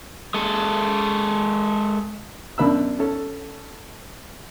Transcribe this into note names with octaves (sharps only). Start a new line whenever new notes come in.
G#3 A4
F#2 B2 D4 B5 E6
C#4 A4